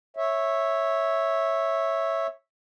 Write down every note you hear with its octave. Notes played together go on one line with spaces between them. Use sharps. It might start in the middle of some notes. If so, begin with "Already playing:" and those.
C#5 E5